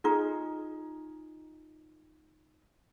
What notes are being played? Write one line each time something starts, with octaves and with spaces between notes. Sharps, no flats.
D#4 F4 G#4